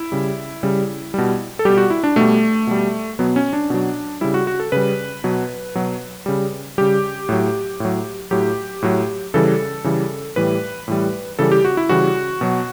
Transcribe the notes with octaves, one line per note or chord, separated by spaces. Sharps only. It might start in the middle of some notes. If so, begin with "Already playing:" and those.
Already playing: E4
C#3 G3
C#3 G3
B2 G3
A4
B2 G3 G4
F#4
E4
D4
B2 G3 A3
B2 G3
B2 F#3 B3
C#4
D4
B2 F#3
C#3 G3 E4
F#4
F#4
A4
C#3 G3 B4
B2 F#3
B2 F#3
C#3 G3
C#3 G3 G4
A2 F#3
A2 F#3
A2 F#3 G4
A2 F#3
C#3 E3 G3 A4
C#3 E3 G3
A2 E3 G3 B4
A2 E3 G3
C#3 E3 G3 A4
G4
F#4
E4
C#3 E3 G3 F#4
B2 F#3